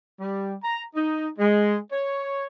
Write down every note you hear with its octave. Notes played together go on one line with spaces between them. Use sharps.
G3
A#5
D#4
G#3
C#5